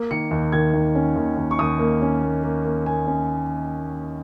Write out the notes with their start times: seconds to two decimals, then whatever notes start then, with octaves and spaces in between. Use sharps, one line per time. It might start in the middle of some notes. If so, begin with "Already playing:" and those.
Already playing: A#3
0.11 D#3 C#7
0.31 D#2
0.52 D#3 G#6
0.74 D#2
0.95 C#4
1.16 D#2
1.37 D#2
1.51 C#6
1.59 D#2 D#6
1.79 A#3
2.02 C#4
2.22 A#3
2.43 A#3
2.65 A#3
2.86 A#3 G#5
3.07 C#4